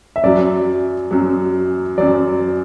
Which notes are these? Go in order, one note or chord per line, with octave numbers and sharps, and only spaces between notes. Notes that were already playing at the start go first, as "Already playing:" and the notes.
E5
F#2 F#3 D5
F#2 F#3
F#2 F#3 D5